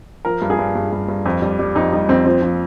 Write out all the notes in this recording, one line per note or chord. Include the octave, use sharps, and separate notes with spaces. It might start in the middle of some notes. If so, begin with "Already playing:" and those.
F3 A#4
G2
G#4
G2
G2
G2
G2
F2
G3
G3
F2 D#4
G3 D#4
F2 C4
F3 C4
F3